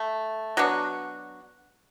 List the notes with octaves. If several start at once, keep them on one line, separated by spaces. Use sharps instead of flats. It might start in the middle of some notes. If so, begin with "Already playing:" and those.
Already playing: A3
F#3 B3 D4 F#4